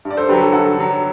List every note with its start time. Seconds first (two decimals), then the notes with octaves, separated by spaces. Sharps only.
0.05 G2
0.11 D5
0.17 A4 C5
0.29 D3 G4 B4
0.33 F#3
0.40 F#4 A4
0.52 G2 F#4 A4
0.77 D3 F#3